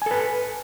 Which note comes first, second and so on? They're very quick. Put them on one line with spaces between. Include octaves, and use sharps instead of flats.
G#5 A4 B4